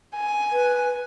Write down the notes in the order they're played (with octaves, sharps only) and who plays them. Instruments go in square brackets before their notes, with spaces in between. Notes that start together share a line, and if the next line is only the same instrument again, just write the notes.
[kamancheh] G#5
[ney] B4